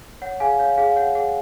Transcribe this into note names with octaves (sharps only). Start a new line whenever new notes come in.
C#5 F#5
G#4 F5 G#5
C#5 F5
G#4 F5
C#5 F#5
G#4 F#5